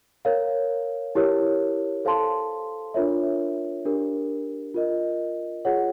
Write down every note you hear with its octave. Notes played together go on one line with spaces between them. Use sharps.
A#4 C#5 F5
E4 G4 A#4 C#5
A4 C5 F5 A5 C6
D4 F4 A#4 C#5 E5
D4 G4 A#4
F4 A#4 D#5
F4 G#4 C#5 F#5